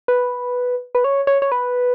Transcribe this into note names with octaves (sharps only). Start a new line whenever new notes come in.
B4
B4
C#5
C#5
C#5
B4